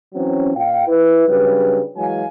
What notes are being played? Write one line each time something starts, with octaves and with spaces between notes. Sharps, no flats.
E3 F#3 C4 C#4
A#2 F5 G5
E4 B4
C#3 F#3 G3 D4 B4
E3 F#3 G#3 F5 G#5